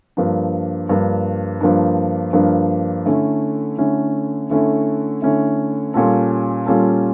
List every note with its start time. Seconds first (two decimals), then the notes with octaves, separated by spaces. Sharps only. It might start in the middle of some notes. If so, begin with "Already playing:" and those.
0.17 G2 F3 A#3 D4
0.89 G2 F3 A#3 D4
1.61 G2 F3 A#3 D4
2.33 G2 F3 A#3 D4
3.06 D3 A3 C#4 E4
3.78 D3 A3 C#4 E4
4.50 D3 A3 C#4 E4
5.22 D3 A3 C#4 E4
5.94 A#2 G3 C#4 F4 A4
6.66 A#2 G3 C#4 F4 A4